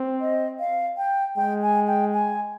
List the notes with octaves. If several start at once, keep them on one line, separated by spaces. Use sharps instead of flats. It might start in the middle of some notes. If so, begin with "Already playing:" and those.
Already playing: C4
D#5
F5
G5
G#3 G5
G#5
G5
G#5